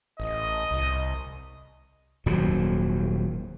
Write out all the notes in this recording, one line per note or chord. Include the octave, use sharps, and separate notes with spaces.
A1 D#5
C2
D#1 D#2 G#2 F#3